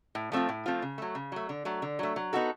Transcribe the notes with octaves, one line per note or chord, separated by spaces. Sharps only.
A2
F3 A3 C4 F4
A2
F3 A3 C4 F4
C#3
F#3 A3
C#3
F#3 A3
D3
F#3 A3
D3
F#3 A3
F#3
B3 D#4 F#4 A4